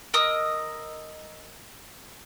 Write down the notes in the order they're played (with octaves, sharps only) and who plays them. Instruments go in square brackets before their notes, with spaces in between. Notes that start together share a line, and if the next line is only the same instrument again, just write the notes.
[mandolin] A#4 D#5 D#6 E6